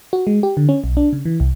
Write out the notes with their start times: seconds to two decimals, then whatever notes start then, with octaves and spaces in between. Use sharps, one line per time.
0.13 F#4
0.27 G#3
0.43 G4
0.57 D3
0.69 C#4
0.84 B1
0.97 D4
1.13 C#3
1.25 E3
1.40 C2